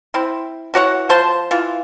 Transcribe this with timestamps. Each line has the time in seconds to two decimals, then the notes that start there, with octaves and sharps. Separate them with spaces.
0.14 C4 E4
0.74 E3 F#4 C#5 F#5
1.09 F3 C5 A5 C6
1.51 E3 F4